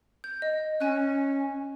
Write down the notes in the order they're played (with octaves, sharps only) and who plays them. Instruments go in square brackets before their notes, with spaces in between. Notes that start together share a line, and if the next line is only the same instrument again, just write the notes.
[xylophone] G6
D#5
[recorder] C#4 [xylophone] G#5 F#6